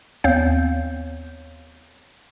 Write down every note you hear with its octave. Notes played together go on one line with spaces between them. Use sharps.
D#2 B3 C4 C#5 F5 G6